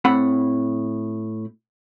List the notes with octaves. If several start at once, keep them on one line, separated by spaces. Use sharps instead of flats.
A2 C4 F#5 B5